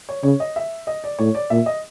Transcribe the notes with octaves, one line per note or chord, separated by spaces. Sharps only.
C#5
C#3 C#5
D#5
E5
D#5
D5
A2 C#5
D5
A#2 E5
D#5